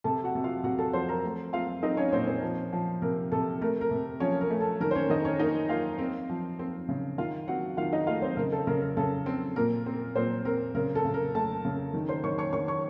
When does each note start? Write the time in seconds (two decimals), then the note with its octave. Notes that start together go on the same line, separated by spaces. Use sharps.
0.04 C3 A4 A5
0.24 F#4 F#5
0.35 C3
0.44 F4 F5
0.64 C3 F#4 F#5
0.78 A4 A5
0.93 F3 C5 C6
1.09 A#4 A#5
1.24 A3
1.53 C4 F4 F5
1.83 C4 D#4 D#5
1.97 C#4 C#5
2.12 A#2 C4 C5
2.27 C4 C5
2.42 F3
2.73 F3
3.02 C3 A#4
3.32 C3 A4
3.61 A3 A#4
3.81 A#4
3.91 C3
4.20 F3 C#4 C#5
4.41 A#4
4.51 A3
4.60 A4
4.80 D#3 A#4
4.91 C5
4.95 C#4 C#5
5.09 D#3 D#4 D#5
5.25 C#4 C#5
5.39 A#3 D#4 D#5
5.69 A#3 F4 F5
5.99 C4
6.30 F3
6.59 C4
6.89 C#3
7.18 D#3 F4 F5
7.48 C4 F#4 F#5
7.77 D#3 F4 F5
7.93 D#4 D#5
8.07 A3 F4 F5
8.22 C4 C5
8.37 C#3 A#4
8.52 A4
8.67 C#3 A#4
8.81 A#4
8.97 C#3 A4
9.26 C4
9.56 A#2 A#4
9.86 C4
10.16 A#2 C4 C5
10.45 C4 A#4
10.75 C#3 A#4
10.95 A4
11.05 C#3
11.14 A#4
11.34 A3 A4 A5
11.65 C#3
11.93 D#3
12.09 C5 C6
12.24 D#3 C#5 C#6
12.38 C#5 C#6
12.53 D#3 C#5 C#6
12.68 C#5 C#6